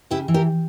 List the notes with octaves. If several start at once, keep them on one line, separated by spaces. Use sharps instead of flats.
C#3 E4 G4
E3
G4 A#4